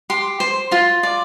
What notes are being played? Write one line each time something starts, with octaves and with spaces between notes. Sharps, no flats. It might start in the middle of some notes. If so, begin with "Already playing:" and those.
G4 C6
C5
F4 C6
D5